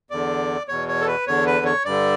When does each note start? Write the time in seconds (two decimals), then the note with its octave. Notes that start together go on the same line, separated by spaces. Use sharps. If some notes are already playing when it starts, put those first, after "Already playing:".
0.10 E2 D3 D5
0.68 E2 B2 C#5
0.88 C#5
1.01 A4
1.07 B4
1.27 E2 D3 C#5
1.46 B4
1.65 C#5
1.85 G2 D3 D5